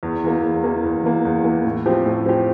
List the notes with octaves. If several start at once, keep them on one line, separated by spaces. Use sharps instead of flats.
E2
E3 A#3
E2
E3 A#3
E2
E3 A#3
E2
E3 A#3
A2
F3 C4 G4
A2
F3 C4 G4